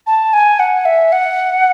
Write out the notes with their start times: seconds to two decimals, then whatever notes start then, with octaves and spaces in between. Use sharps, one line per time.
0.07 A5
0.33 G#5
0.59 F#5
0.85 E5
1.12 F#5